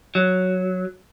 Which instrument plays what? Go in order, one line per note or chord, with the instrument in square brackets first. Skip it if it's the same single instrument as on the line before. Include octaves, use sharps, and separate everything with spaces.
[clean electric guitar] F#3